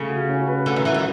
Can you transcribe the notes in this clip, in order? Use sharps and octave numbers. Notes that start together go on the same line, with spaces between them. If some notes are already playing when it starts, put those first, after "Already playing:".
Already playing: C#3 A3
F#4
C#4
B4
D3 A3
D#3
E3 F#4
D#3